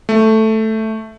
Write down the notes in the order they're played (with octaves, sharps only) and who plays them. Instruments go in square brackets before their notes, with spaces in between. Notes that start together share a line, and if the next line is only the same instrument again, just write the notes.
[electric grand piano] A3